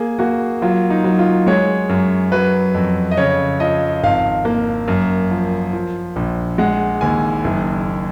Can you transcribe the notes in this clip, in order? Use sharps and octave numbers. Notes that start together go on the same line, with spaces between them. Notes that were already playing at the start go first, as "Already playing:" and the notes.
Already playing: A#3 G#4
A#3 F#4
F#3 F4
D#4
F#3
F4
G#3 C#5
F#2
F#3 B4
F2
D#5
C#3 C#5
F3 D#5
G#1 F5
A#3
F#2
F3
F3
A#1
G#3 F#5
D#2 G#5
F#1